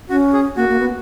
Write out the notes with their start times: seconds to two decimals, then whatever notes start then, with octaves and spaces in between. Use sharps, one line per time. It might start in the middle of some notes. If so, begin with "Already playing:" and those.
0.09 C#4 F#4
0.33 G#4
0.56 A#3 F#4
0.69 A#3
0.79 B3